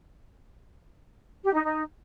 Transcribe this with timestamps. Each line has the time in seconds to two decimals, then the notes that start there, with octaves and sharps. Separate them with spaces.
1.44 G4
1.54 D#4
1.64 D#4